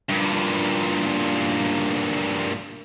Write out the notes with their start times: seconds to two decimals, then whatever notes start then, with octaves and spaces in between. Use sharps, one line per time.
0.10 G2 A#2